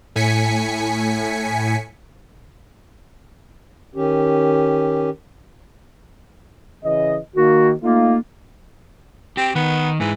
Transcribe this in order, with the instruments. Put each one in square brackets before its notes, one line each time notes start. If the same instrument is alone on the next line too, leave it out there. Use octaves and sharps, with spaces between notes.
[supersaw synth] A2 G#5 B6 C#7
[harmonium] D#3 C#4 G4
[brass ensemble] C#3 E3 D#5
[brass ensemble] D#3 A#3 [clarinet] F#4
[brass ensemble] A3 D#4 F4 [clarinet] A#3
[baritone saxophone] C4 [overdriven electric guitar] G4
[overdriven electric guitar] D#3 [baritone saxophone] B3
[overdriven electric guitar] G#2 G#3 [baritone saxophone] E3